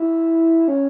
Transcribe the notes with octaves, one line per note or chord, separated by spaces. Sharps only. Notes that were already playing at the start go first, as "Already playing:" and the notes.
Already playing: E4
C#4